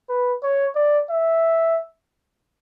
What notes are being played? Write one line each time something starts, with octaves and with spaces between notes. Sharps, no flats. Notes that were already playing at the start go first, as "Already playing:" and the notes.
B4
C#5
D5
E5